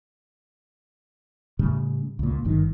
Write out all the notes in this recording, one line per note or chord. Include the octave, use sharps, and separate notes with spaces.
A2 C#3 G3
C#2 A#2
G1 G2 D#3